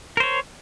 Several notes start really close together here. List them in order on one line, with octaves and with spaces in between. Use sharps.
A#4 C5 C#5